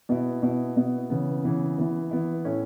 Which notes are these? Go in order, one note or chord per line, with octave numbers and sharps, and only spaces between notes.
B2 B3 E4
B2 B3 E4
B2 B3 E4
C#3 E3 B3
C#3 E3 B3
E3 B3 E4
E3 B3 E4
A2 A3 C#4 E4